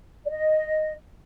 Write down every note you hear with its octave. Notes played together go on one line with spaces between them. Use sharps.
D5
D#5